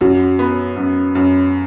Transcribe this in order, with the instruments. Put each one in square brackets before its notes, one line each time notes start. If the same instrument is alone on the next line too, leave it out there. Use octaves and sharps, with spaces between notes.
[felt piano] F#2 [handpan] F#4
[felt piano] B3
F#2
F#2